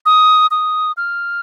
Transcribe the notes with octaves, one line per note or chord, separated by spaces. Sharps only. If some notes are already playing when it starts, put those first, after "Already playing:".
D#6
D#6
F6